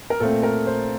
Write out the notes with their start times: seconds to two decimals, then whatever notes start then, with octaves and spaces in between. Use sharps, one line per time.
0.10 A#4
0.20 A#2 A3 C4 A4
0.43 A#4
0.67 C5